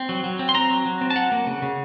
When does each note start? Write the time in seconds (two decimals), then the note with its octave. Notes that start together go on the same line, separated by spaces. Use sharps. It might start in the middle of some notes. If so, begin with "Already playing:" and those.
Already playing: C4
0.09 F#3
0.24 F#3
0.39 C4
0.49 C6
0.54 C4 A#5
0.70 F#3
0.85 F#3
1.01 C4
1.10 A5
1.16 F#3 F#5
1.32 A#3
1.47 C#3
1.62 C#3